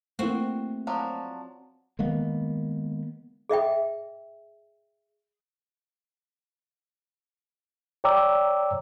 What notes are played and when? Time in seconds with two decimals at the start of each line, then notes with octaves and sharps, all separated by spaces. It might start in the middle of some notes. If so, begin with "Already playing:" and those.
0.19 A3 A#3 C4 E4 F#4
0.87 F3 F#3 D4
1.99 D#3 G#3 A#3 B3
3.49 G#4 D#5 E5 G5
8.04 C#5 D5 G5 A#5 D6 E6